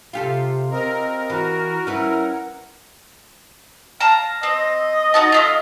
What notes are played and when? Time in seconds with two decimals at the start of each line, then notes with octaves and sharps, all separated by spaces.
0.13 C3 F4 G4 A4
0.71 C4 A#4 D#5
1.30 E3 F#4
1.87 C#4 E4 B4 F#5
4.00 F5 A5 A#5
4.43 C4 D#5
5.14 D#4 F#4 A5
5.32 A3 D4 F4